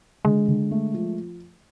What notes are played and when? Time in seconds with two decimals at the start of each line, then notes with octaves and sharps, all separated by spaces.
0.25 D3 G#3
0.48 D3
0.71 A3
0.94 F3